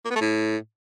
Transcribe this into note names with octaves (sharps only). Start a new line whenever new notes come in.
A#3
B3
A3
A2